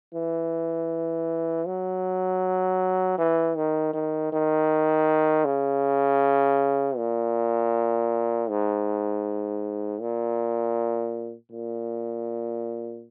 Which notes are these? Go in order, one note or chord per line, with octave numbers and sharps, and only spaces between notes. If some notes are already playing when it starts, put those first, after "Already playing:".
E3
F#3
E3
D#3
D#3
D#3
C#3
A#2
G#2
A#2
A#2